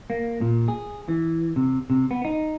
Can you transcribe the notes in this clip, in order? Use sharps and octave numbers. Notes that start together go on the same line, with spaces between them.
A#3
A#2
G#4
E3
C3
C3
B3
D#4